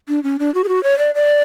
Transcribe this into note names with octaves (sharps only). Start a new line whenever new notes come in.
D4
C#4
D4
F#4
G#4
F#4
C#5
D5
D5